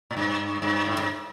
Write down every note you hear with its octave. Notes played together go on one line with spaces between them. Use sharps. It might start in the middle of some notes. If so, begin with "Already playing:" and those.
A2
G2
G2
A2
G2